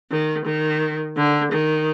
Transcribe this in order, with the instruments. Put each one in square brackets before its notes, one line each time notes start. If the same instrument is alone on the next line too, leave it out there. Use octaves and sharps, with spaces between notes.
[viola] D#3
D#3
D3
D#3